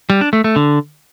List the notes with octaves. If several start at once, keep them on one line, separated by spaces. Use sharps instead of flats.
G3
D4
A3
A3
D3